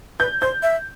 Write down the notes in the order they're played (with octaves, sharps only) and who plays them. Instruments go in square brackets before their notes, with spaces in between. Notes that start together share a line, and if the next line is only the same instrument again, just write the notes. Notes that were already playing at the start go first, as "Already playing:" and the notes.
[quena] B4 [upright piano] G6
[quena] C5 [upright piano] G6
[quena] E5